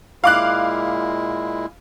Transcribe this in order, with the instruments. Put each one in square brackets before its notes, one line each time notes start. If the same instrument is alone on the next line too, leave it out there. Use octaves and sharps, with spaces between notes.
[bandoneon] A#2 G#3 E4 [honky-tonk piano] F5 D6 F#6